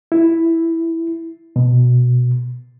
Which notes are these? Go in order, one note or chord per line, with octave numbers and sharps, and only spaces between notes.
E4
B2